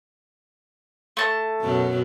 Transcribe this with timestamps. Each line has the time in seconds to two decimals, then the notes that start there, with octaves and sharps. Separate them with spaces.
1.17 A3 A5
1.61 F#2 B2 F#3